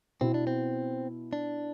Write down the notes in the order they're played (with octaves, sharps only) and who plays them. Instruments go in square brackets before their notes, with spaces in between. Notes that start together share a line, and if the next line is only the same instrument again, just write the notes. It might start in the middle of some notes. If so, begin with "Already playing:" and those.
[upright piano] B2 B3 E4 [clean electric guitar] C4
[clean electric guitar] D4
C4
D4